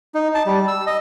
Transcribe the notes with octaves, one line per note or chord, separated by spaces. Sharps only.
D#4
A5
G3
E6
D#5